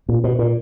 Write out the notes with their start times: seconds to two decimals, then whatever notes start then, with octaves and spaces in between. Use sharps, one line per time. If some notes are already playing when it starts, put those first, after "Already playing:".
0.09 A#2
0.24 B2
0.39 A#2